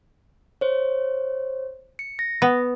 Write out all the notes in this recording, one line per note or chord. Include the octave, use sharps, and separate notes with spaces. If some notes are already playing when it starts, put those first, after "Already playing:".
C5 C#5
C#7
A#6
B3